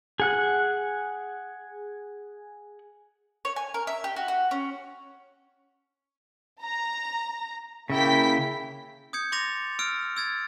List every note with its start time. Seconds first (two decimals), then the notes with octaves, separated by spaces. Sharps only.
0.20 G#4 F#5 F#6
3.45 C#5
3.56 G#5
3.74 A#4
3.87 E5
4.04 G4
4.16 F#4
4.28 F#4
4.51 C#4
6.61 A#5
7.90 C#3 A#3 E4 G5 B6
9.13 D#6 G6 G#6 C#7
9.32 C6 D6 A6 A#6 F7
9.79 E6 F6 D7
10.17 E6 G#6 A6